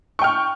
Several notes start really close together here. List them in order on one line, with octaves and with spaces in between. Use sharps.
C#6 G5 F6